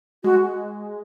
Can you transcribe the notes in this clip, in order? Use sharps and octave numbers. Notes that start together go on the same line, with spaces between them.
G#3 F#4